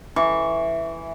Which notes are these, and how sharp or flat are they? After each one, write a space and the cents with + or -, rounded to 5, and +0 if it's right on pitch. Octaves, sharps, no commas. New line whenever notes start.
E3 +0 C#6 +0